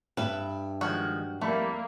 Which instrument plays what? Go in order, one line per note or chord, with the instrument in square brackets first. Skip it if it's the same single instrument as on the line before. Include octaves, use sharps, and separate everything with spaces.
[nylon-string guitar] G2 E5 [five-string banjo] B4
[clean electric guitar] D#3 F3 G#3 [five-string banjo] F#4
[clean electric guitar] F2 G3 E4 [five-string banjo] A3 [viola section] A#3